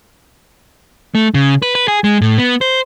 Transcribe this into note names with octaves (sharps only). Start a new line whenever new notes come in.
A3
C#3
B4
B4
G#4
G#3
A2
B3
C5